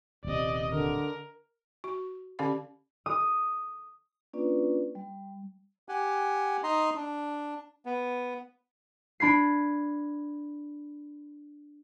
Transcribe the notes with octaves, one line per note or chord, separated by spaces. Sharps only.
D#1 C3 D5 D#5
D3 A#4
F#4
D3 C#4 G4 D5 F5 B5
D#6
A#3 C#4 D4 F4 B4 D5
G3
G4 F#5 G#5
D#4 D#5 A#5 C6
D4
B3
D4 B5 G#6 C7